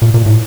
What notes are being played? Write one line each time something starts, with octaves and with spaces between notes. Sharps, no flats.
A#2
A#2
A2